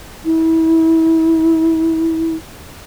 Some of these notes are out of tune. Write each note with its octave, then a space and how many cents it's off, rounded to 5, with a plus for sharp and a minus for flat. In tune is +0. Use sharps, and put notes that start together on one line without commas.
E4 -25